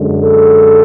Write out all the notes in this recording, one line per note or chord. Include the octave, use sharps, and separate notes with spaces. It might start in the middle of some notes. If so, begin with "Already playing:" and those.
Already playing: F#2 D3 G#3
A4